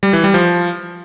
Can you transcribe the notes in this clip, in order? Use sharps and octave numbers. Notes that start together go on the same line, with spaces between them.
G3
E3
G3
F3